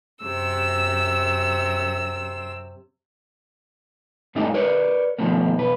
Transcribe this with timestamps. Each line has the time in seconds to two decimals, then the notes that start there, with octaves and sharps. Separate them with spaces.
0.22 F#2 C3 E6
4.35 G2 G#3 A3 D4 D#4 G4
4.54 A#4 B4 C#5 D5
5.19 B2 D#3 F3 A3 A#3
5.57 B1 E2 B4